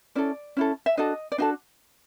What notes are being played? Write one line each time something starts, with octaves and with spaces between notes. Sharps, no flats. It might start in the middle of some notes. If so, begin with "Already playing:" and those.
C#4 E4 A4 D5
C#4 E4 A4
E5
D4 F#4 A4 D#5
D5
D4 F#4 A4 D#5